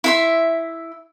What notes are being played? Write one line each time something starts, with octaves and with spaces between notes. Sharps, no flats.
E4 E5 C6